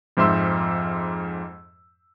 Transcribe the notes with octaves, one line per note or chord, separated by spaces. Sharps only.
F2 G#2 C5 E5 C6 E6